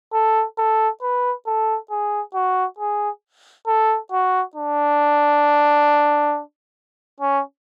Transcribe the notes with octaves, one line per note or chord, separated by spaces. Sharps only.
A4
A4
B4
A4
G#4
F#4
G#4
A4
F#4
D4
C#4